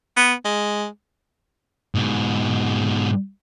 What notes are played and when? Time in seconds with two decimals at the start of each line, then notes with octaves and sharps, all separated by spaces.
0.17 B3
0.45 G#3
1.95 G#2 B2